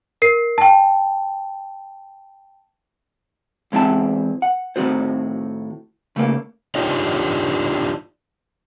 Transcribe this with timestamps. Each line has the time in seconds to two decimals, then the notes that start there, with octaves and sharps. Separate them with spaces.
0.22 A#4 C7
0.58 G5 A5
3.72 E2 G#3 C4 E4 A5
4.42 F#5
4.76 A2 D#3 G3 C4 F#4 C5
6.16 C#3 A3 A#3
6.75 D4 D#4 F4 G4 C#5 D#5